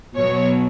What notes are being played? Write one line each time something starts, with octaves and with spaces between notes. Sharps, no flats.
B2 F#3 C#5